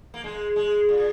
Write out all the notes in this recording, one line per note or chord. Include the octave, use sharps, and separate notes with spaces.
A#3
G#3
G#3
A#2